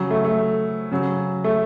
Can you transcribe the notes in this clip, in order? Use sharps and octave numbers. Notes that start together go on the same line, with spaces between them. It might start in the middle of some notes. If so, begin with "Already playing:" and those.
Already playing: C#3 F#3
A3
A3
C#3 F#3
A3